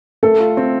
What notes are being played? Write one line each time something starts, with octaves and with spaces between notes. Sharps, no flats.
A3 A4
F4
C4